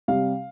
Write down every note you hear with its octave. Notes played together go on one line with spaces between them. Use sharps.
C3 G3 F5